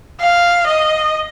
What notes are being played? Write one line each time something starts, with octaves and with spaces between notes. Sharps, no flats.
F5
D#5